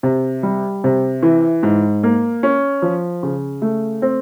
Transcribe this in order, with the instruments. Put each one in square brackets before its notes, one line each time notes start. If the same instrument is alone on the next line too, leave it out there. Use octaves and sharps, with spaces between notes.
[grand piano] C3
G3
C3
E3
G#2
A#3
C#4
F3
C#3
A3
C4